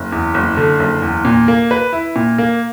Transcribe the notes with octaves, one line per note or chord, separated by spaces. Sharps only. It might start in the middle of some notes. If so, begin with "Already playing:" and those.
Already playing: F#1
E2
F#1
D3
F#1
E2
A#2
A#3
B4
E4
A#2
A#3